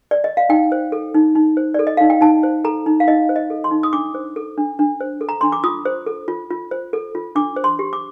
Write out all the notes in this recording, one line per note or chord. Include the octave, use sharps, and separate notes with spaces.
D5
D#5
F5
D#4 G5
C5
A4
D#4
D#4
C5
A4 D5
D#5
D#4 F5
G5
D#4 A5
C5
A4 A#5
D#4
F5
D#4 D#5
C5
D#5
A4
C6
D#4
D#6
D4 D6
C5
A4
D4
D4
C5
A4
A#5
D4 C6
D6
F4 D#6
C5
A4
F4
F4
C5
A4
F4
D4 D6
C5
C6
G4
D6